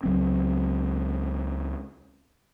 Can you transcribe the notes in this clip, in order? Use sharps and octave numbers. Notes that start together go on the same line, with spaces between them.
C#2 F#3 C4